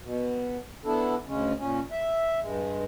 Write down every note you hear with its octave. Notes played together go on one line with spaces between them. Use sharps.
B2
B3 D4 E4 A4
D2 C#3 G#3 C#4
A#2 C#4
E5
G2 G#3